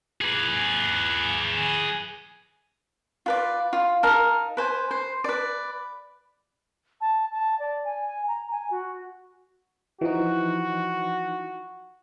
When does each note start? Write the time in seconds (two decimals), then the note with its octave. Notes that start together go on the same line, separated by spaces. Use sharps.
0.21 G#4 B4
3.26 F4 B4 D5
3.73 F4
4.03 D#4 A#4 F5 A5
4.57 B4 C5 G#5
4.91 C5
5.24 B4 D5
7.01 A5
7.32 A5
7.60 D5
7.85 G#5
8.28 A#5
8.51 G#5
8.71 F#4
10.01 E3 F3 D#4 F#4